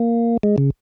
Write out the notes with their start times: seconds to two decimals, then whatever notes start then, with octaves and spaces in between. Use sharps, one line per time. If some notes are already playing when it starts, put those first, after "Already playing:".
Already playing: A#3
0.43 G#3
0.58 C#3